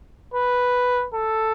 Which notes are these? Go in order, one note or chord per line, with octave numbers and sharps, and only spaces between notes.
B4
A4